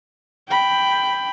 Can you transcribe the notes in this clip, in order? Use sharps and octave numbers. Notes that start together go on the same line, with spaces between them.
G5 B5